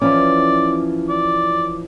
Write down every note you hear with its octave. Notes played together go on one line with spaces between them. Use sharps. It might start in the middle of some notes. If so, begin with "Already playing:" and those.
E3 F3 C#4 D5
D5